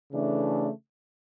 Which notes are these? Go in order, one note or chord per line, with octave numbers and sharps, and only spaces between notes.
C#3 E3 A3 D4